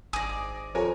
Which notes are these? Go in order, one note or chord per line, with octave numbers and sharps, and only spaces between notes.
G#1 G#4 D5 D#6 A#6
F2 A#4 C#5 G#5